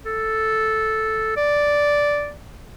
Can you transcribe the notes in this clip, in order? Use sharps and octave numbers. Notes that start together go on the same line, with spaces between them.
A4
D5